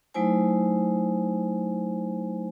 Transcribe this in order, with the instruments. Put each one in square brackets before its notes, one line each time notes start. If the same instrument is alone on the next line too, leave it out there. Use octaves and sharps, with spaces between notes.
[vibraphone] F#3 A3 D#4 E4 C5 G#5